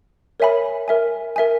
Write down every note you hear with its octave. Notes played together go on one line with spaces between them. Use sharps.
A#4 C#5 E5 G#5 B5
A#4 E5 G#5
A#4 E5 G#5